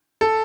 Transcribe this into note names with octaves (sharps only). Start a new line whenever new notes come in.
A4